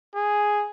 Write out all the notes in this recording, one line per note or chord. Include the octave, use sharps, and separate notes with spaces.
G#4